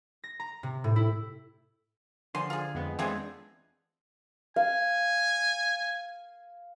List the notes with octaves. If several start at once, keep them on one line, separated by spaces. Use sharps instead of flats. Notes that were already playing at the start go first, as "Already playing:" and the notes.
A#6
A#5
C3
A2
E4
D3 F3 F#5 G#5 C6
F4 G#4
F2 G#3 B3
D3 E3 G#3 B3 C4 F4 G#4
F5 G#5